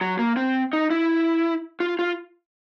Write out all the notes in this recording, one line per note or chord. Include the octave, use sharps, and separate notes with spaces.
F#3
A#3
C4
D#4
E4
F4
F4